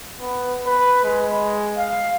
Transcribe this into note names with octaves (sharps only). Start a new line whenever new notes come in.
B3
B4
G#3
F5